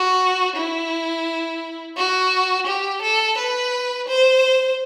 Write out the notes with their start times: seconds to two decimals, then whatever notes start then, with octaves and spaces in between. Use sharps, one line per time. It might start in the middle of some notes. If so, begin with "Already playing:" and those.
Already playing: F#4
0.56 E4
1.96 F#4
2.66 G4
3.02 A4
3.37 B4
4.07 C5